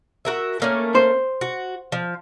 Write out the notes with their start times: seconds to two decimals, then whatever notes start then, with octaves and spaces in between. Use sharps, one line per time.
0.25 F#4 A#4 E5
0.60 A3 A#3 C#4
0.95 C5
1.41 F#4
1.92 F3